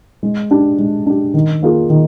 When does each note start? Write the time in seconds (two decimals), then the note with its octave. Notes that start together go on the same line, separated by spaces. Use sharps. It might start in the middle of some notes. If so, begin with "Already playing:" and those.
0.23 G#3
0.51 D4 G4
0.79 G#3
1.06 D4 G4
1.34 D#3
1.63 A#3 F4 G#4
1.90 D#3